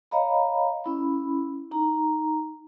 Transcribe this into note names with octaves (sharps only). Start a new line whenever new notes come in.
C#5 D#5 F5 A#5 B5
C#4 E4 B5
D#4 A#5